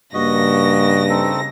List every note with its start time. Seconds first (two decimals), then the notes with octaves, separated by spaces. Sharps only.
0.14 G2 C#3 A#3 F#4 D#5 A#6
1.10 C4 D#4 A4